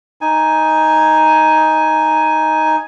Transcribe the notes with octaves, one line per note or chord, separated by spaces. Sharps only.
D#4 G#5